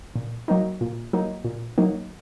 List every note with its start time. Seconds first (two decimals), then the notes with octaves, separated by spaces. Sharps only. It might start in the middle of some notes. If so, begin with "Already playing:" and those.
0.16 A#2
0.48 F#3 A#3 D#4
0.81 A#2
1.13 F#3 A#3 D#4
1.45 A#2
1.78 F#3 A#3 D#4